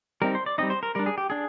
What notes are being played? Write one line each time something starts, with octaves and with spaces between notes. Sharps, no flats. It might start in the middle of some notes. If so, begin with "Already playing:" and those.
G3 C4 D#4 A#4
C5
D5
G3 C4 D#4 D#5
C5
A#4
G3 D4 A#4
G#4
G4
D4 G#4